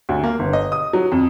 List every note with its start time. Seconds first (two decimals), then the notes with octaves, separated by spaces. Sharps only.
0.09 D2
0.24 A#3
0.39 G1
0.53 D#5
0.72 D#6
0.93 F#3
1.12 F2